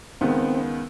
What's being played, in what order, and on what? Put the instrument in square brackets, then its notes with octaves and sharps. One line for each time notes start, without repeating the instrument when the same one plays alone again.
[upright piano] C#2 D#3 B3 [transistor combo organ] C4